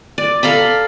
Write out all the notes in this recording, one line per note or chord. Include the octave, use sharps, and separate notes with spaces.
D5
A4 F5 A#5 B5